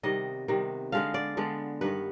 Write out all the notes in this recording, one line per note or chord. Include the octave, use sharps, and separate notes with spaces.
C3 D#3 G3 B3 D#5
C3 D#3 G3 B3
D3 G#3 B3 F5
D5
D3 G#3 B3
G2 D#3 B3 B4